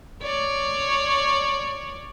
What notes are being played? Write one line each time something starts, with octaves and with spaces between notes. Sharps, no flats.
C#5 D5